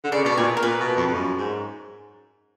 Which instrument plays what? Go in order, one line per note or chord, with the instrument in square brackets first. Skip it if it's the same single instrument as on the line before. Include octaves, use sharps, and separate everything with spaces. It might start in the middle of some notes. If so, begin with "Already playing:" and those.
[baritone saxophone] D3
[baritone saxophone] C#3 [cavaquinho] D5
[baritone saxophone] B2 [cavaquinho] D5
[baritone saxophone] A#2 [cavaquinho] C#5
[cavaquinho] A#4
[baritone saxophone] A#2 [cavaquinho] B4
[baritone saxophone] B2
F2
G2
F#2
G#2